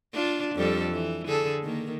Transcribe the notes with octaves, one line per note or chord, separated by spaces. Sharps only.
D4 F4
F2 G3 A4
E3
D3 G#4 A4
D#3 A#3